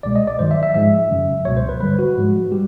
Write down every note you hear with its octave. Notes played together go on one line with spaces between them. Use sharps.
C2 B2 G#3 D5
D#5
D5
G2 D#3 F#3 C5
E5
E5
G#2 F3 G#3 E5
F#2 C#3 F#3
C#2 B2 F#3 C#5
C5
B4
G2 D3 G3 B4
F#4
G#2 F3 G#3
G3 G4